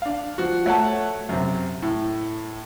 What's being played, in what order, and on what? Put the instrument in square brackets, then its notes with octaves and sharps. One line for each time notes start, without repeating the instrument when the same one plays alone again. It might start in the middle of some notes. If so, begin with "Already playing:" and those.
[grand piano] D4 F5
F3 F#4
A3 C#5 F#5 A5
F#2 C3
A2